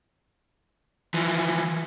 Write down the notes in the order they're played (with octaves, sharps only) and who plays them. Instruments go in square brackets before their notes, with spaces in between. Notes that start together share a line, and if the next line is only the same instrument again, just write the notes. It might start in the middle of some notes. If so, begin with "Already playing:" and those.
[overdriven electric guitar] E3 F3